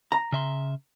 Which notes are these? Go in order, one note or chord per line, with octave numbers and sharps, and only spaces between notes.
A#5
C#3 E5 C6